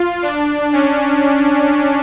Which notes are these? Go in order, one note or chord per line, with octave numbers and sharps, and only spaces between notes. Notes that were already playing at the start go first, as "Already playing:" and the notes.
Already playing: F4
D4
C#4